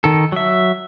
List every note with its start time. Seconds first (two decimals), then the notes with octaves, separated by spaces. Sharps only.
0.04 D#3 A4
0.32 F#3 E5